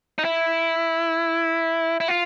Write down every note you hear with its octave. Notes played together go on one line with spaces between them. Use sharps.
D#4
E4
E4
F4